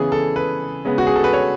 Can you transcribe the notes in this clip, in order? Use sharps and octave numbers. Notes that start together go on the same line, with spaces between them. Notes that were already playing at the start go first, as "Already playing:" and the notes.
Already playing: C#3 E3 B3 G#4
A4
B4
C#3 G#3 B3
F#4
G#4
A4
B4
C#5